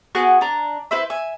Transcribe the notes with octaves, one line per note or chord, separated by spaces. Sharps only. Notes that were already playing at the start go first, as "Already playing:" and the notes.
B3 F#4 G#4 F#6
D4 A#5
E4 B4 C5 E5
E5 G#5